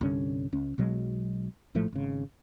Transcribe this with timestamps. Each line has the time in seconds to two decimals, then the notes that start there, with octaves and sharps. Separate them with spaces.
0.01 C2 G2 D3 C#4
0.53 C#2 C#4
0.78 B1 B2 F#3 G#3
1.75 A#1 A2 F3 A3
1.92 G#1 C#3